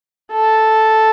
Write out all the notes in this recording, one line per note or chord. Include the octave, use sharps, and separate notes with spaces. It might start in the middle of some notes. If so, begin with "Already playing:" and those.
A4